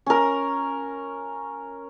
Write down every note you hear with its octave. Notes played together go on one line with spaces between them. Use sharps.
C#4 A#4